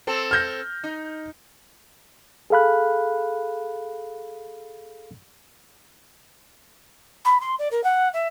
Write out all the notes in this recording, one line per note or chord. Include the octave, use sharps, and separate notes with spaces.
C4 A4
F6 G6 A#6
D#4
G#4 A4 F5 B5 F#6
B5
C6
D5
A#4
F#5
E5